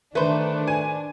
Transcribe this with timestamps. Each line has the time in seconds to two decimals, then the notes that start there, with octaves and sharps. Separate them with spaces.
0.15 D#3 A3 D4 B4 C5
0.67 G#5